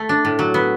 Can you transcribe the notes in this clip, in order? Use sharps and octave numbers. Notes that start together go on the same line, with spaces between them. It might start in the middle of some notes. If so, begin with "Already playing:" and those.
Already playing: A3
D4
A2
F#3
B3